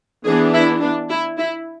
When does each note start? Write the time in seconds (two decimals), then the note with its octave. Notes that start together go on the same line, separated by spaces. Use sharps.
0.25 E3 B3 D4 G#4
0.53 E4
0.81 D4
1.09 E4
1.37 E4